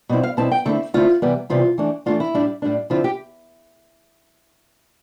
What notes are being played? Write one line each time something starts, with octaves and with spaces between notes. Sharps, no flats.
B2 G3 C4 E4
F5
B2 G3 C4 E4 A5
G5
D3 A3 C4 E4 A4
D3 A3 C4 E4 F4
C3 E3 G3 B3
C3 E3 G3 B3 F4
E3 A3 D4
E3 A3 D4 F4
E4
A2 G3 D4
A2 G3 D4
D3 F3 C4 E4 F4
G4